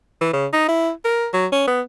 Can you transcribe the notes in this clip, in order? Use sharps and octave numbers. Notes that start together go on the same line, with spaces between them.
E3
C#3
D#4
E4
A#4
F#3
C#4
B3